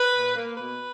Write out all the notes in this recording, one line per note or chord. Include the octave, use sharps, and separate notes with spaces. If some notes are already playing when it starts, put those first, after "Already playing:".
Already playing: B4
A#2
A#3
B2 B4